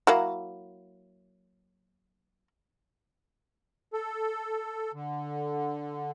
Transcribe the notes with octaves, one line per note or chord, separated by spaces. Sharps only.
F#3 A#3 E4
A4
D3